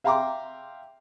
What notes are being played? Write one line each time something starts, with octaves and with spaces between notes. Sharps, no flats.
E5 F5 G5 A#5 C6 D6